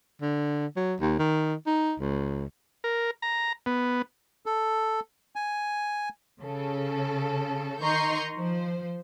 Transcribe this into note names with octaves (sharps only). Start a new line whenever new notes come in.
D3
F#3
D#2
D#3
D#4
C#2
A#4
A#5
B3
A4
G#5
C#3 A4
D#3 D#5 A#5 C6 C#6 G6
F3 C5